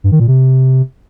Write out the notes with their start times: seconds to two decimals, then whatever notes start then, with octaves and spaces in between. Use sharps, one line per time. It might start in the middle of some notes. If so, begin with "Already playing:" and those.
0.04 G2
0.12 D#3
0.20 A#2
0.28 C3